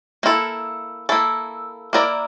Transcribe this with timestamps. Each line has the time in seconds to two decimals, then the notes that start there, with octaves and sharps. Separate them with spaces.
0.23 A#3 E4 A4
1.09 A#3 E4 A4
1.93 A#3 E4 A#4 D5